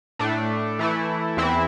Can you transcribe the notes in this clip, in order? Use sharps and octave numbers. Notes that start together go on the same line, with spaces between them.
A2 A3 D4
E3 A3 E4
E2 E3 C4 E4